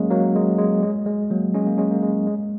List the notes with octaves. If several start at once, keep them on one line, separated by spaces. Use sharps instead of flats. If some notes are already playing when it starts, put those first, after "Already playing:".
Already playing: F#3 G#3 A#3 C#4
F#3 A#3
G#3
G#3
G#3
G#3
F#3 A#3
G#3 C#4
A#3
G#3 C#4
A#3
G#3
G#3